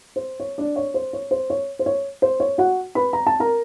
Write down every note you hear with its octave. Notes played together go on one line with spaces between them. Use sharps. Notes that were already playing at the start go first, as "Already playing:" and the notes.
C5
C#5
D4 D5
C#5
C5
C#5
C5
C#5
C5
C#5
C5
C#5
F#4 F#5
B4 B5
A#5
A5
A#4 A#5